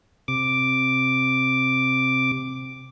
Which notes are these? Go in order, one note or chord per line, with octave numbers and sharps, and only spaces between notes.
C3 D6